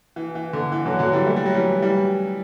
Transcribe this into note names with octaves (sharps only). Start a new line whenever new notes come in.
E3
E3
D3
E3
D3 F#3
D3 F#3
E3 G3
A3
G3
F#3
E3 G3
E3 G3